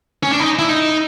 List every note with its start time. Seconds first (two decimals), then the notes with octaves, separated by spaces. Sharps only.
0.23 C#4
0.31 D4
0.40 D#4
0.59 E4
0.69 D#4